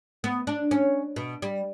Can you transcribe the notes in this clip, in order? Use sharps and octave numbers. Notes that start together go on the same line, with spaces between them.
B3
D4
C#4
B2
G3